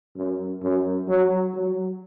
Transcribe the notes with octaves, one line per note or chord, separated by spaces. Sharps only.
F#2
F#2
F#3
F#3